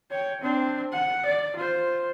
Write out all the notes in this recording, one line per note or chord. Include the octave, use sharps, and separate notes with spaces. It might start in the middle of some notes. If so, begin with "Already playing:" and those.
C#5 G5
C4 D4
F#5
D5
F4 C5